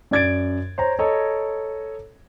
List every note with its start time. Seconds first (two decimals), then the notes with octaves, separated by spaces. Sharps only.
0.11 F#2 D5 G#6 A6 D7
0.78 C5 C#5 A#5
0.99 A4 C#5 D#5 A#5